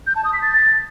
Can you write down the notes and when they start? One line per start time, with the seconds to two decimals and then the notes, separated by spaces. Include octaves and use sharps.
0.07 G6
0.16 A5
0.24 D#6
0.33 B6
0.42 A6